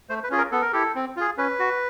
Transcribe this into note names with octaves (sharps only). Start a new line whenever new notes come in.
A3 C5
B4
C#4 F4 G#4
A#4
B3 A4
A#4
E4 G4 A4
C4
F4 G#4
C#4 B4
F#4